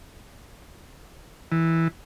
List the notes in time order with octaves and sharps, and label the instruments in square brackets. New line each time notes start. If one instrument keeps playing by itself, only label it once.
[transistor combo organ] E3